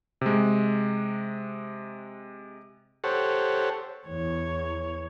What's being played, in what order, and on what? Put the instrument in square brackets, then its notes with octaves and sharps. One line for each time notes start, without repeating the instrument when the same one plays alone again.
[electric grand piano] C3 G#3
[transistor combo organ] G4 A4 C5 C#5 F#5
[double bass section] E2 [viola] C#5